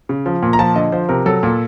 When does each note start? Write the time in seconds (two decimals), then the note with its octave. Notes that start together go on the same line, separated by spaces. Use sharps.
0.09 C#3
0.26 F3
0.43 A#2
0.53 A#5
0.59 F3 A5
0.75 D3 D#5
0.92 F3 C5
1.09 C3 A#4
1.26 F#3 A4
1.43 A#2